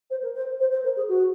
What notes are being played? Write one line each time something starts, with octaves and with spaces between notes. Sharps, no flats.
C5
A#4
C5
C5
C5
A#4
G#4
F#4